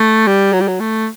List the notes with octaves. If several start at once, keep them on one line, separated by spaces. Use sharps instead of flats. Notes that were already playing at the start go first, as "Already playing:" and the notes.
Already playing: A3
G3
F#3
G3
F#3
A3